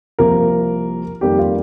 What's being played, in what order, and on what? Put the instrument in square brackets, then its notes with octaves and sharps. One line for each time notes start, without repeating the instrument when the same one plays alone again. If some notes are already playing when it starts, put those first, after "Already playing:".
[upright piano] C2 C3 F3 A#3 A#4
F2 D#3 G3 A#3 G4
F4